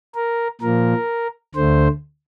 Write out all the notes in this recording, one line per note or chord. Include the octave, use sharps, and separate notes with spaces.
A#4
A#2 F3 A#3 A#4
D2 D3 A3 C5